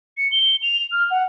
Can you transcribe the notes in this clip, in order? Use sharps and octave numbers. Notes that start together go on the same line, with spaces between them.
C#7
G7
F7
F6
F#5